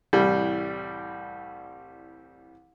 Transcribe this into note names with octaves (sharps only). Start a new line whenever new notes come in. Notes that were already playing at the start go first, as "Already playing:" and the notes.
C2 A2 E3 G3